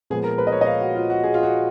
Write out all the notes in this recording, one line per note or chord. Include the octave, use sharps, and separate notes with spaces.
A#2 F3 G#3 B3 G#4
A#4
B4
D#5
C#5
D#5
F5
F#4
F4
F#4
G#4
F4
F#4